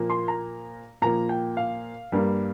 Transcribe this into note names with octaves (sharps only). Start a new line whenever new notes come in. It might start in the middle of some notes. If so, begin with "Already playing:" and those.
Already playing: A#2 F3 A#3
C6
A#5
A#2 F3 A#3 A#5
G5
F5
G2 G3 A#3